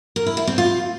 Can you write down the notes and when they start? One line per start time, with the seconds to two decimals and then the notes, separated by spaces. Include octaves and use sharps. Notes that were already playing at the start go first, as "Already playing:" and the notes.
0.16 A#4
0.26 E4
0.37 E4
0.47 C4
0.58 F4